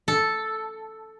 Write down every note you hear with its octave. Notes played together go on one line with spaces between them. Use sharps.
A4